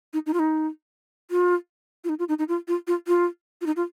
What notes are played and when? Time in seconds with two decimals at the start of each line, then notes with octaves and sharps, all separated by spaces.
0.13 D#4
0.26 D#4
0.34 F4
0.39 D#4
1.31 F4
2.04 F4
2.09 D#4
2.19 F4
2.29 D#4
2.39 D#4
2.48 F4
2.68 F4
2.87 F4
3.07 F4
3.61 F4
3.66 D#4
3.76 F4